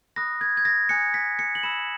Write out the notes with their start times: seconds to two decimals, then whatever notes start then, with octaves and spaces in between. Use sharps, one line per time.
0.16 B5 D#6 F#6 A#6
0.41 G#6
0.57 G#6
0.65 A#6
0.89 G#5 D#6 F#6 C#7
1.14 B6
1.39 C#7
1.55 F#7
1.63 B5 E6 E7